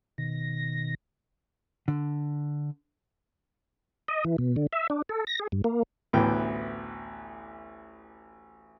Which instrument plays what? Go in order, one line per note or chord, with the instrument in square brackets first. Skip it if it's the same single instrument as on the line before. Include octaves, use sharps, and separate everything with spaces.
[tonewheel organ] B2 D#3 A#6
[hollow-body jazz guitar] D3
[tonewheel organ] D#5
E3
B2
D3
E5
D4
A4
A#6
G#4
G2
A#3
[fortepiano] A1 D2 E3 B3 G5